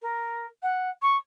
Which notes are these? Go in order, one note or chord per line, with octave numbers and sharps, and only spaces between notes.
A#4
F#5
C#6